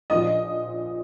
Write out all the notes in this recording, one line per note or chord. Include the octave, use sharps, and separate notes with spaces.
A#1 A#2 F3 D#5 D#6